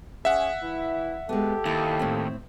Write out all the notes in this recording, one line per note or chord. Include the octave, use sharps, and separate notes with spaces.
C#4 G#4 E5 F#5
E3 E4
G#3 B3 G4 A4
D#2 E4
A2 C4